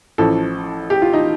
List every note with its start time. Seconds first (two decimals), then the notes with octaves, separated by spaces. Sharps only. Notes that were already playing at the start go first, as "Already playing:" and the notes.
0.18 A1 A2 F3 A4
0.90 G4
1.02 F4
1.13 D#4